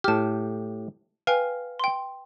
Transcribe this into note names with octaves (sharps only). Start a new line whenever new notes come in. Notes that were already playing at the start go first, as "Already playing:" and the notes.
A2 G4 A5 F6
B4 F5 G5 G#5
G5 C6